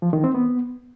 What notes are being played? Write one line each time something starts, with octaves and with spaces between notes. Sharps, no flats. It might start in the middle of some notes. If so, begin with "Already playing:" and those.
F3
D#3
C4
B3